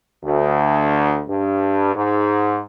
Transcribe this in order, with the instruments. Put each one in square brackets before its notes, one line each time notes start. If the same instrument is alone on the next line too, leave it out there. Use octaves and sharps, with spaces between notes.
[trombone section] D2
G2
G#2